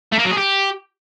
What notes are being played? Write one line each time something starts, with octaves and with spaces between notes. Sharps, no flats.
A3
A#3
F#3
G#4
G4